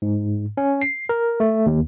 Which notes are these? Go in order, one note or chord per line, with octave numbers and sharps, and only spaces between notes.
G#2
C#4
C7
A#4
A3
D#2